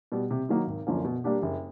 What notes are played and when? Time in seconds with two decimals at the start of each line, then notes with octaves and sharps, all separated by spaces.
0.12 B2 G3
0.31 C3
0.49 D#3 F#3 A#3 D#4
0.67 G#1
0.87 F#2 D3 F3 A#3
1.04 B2
1.24 G3 A#3 D4 G4
1.42 F#1